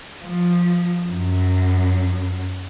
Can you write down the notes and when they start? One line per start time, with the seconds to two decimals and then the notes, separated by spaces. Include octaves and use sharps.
0.22 F3
1.09 F#2